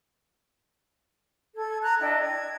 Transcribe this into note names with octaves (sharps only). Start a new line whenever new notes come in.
A4 G#6
A#5 F#6 G#6
D4 E4 D#5 G5
G#6